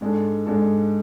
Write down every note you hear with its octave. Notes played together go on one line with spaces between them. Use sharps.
G#2 G#3 D4 A4
G#2 G#3 D4 A4